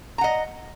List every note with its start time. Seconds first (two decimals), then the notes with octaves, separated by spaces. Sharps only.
0.18 A#5
0.21 F#5
0.24 D#5